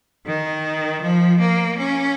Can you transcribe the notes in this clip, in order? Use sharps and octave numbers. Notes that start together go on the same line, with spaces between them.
D#3
F3
A#3
C#4